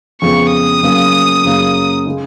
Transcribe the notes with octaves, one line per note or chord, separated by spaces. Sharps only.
F2 C#3 G#3 B3 C#6
D#6
C#3 F#3 A#3 C#4
F#2 C#3 F#3 A#3
C#3 G#3 C#4